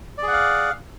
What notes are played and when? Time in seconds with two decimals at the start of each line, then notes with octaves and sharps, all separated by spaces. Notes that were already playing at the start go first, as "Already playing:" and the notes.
0.18 D5
0.23 G#4
0.28 F#5
0.33 F5